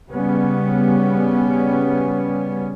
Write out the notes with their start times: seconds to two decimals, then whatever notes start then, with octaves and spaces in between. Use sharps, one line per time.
0.10 C#3 G3 B3 C#4